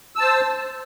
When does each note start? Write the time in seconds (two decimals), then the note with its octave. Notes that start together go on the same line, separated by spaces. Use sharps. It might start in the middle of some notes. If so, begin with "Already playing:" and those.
0.16 E6
0.18 A5
0.21 C5